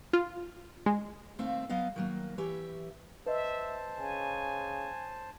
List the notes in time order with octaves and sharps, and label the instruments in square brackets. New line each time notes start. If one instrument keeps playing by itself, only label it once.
[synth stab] F4
G#3
[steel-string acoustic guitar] D#2 A3 C4 E5 F5
F#3 B3 D#5 F5
D#3 F#3 A#3
E3 G4 C#5 E5
[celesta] B4 D#5 [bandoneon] C5 A5 [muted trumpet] E5
[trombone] C#3 [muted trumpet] G#5